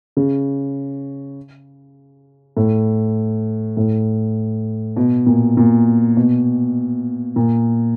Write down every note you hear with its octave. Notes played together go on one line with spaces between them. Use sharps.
C#3
A2
A2
B2
A#2
A#2
B2
A#2